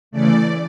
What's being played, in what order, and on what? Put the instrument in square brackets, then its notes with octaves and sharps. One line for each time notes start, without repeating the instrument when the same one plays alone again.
[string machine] C#3 E3 A3 D5